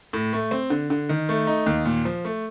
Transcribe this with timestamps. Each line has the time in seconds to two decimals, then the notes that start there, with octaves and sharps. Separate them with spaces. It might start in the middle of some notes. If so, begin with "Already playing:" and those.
0.13 A2
0.33 A3
0.51 C4
0.70 D3
0.90 D3
1.09 D#3
1.29 A3
1.47 D#4
1.66 D#2
1.85 A#2
2.05 F3
2.25 A3